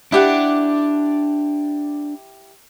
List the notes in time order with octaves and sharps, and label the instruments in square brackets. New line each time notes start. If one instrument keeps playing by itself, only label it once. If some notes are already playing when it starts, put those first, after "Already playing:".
[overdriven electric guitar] D4 [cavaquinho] E4 G4 F#5